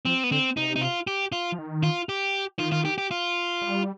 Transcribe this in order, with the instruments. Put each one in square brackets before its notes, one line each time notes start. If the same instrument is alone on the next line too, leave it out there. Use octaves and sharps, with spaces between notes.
[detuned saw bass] F3 [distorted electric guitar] C4
[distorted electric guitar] B3
[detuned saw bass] D3 [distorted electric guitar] C4
[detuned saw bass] C3 [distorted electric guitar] D#4
[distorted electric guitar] D#4
F4
G4
F4
[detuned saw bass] F3
D#3
[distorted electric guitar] F4
G4
[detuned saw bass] D#3 [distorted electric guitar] F4
[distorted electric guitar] F4
G4
G4
F4
[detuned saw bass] G3